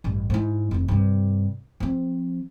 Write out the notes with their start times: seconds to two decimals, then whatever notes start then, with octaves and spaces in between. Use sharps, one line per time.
0.04 A1 G2
0.30 G#2 E4
0.71 F1 D#2
0.88 G2 C3
1.80 F3 C4